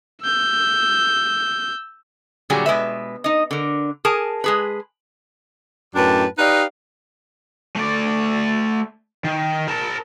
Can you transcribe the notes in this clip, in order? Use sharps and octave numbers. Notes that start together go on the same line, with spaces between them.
E6 G6
A#2 D3 F#3 G3 F#4 G#4
B2 G#3 B4 E5
D#4 D#5
D3 A#4
G#4 A#4 G#5 A5
G#3 G#4 B4
F#2 A2 D4 B4 G5 A5
D#4 G4 B4 D5 D#5 F5
A3 D5
D#3
A#4 A5